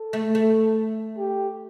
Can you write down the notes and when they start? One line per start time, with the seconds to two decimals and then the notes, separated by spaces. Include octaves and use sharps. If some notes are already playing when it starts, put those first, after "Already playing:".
Already playing: A4
0.13 A3
0.35 A3
1.19 G4